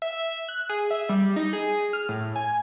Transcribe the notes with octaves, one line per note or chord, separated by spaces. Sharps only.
E5
F#6
G#4
E5
G3
D#4
G#4
F6
A2
G#5